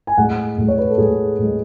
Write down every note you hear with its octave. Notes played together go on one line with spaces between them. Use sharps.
G#5
A2 G#3 F#5
A2 G#3
C#5
B4
A4
A2 G#3 G#4
A2 G#3